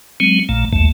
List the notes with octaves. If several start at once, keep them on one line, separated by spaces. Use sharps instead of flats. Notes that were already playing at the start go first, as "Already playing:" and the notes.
F#3 G#3 C4
A#1 A#2 A3
A1 D#2 A3